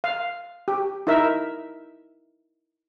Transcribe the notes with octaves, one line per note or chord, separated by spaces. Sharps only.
F5
G4
D#4 E4 A#4 E5